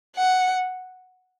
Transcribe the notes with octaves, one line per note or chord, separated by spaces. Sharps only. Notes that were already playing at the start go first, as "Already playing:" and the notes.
F#5